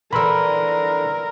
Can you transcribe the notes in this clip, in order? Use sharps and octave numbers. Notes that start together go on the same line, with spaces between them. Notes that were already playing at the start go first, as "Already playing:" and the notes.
D3 E3 A#4 B5 C6 E6